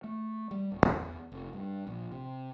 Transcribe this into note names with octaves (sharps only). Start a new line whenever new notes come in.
A3
G3
D1
E2
F1
G2
A#1
C3